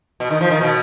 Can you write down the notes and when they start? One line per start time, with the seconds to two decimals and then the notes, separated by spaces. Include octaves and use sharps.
0.20 B2
0.30 D#3
0.41 F3
0.51 D#3
0.61 B2